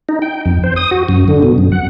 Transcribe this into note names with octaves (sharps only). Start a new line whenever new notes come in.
D#4
G5
F2
C5
D#6
F#4
F#2
D3
B2
F#2
F#5